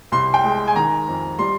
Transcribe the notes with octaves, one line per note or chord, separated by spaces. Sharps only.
C2 C6
G5
G#3
G#5
D#3 A#5
F2
G3 C6